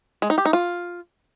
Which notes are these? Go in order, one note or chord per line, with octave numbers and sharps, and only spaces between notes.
G#3
D#4
G4
D#4
F4